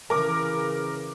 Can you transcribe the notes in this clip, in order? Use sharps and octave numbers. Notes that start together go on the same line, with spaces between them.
C#3 E3 A#4 D6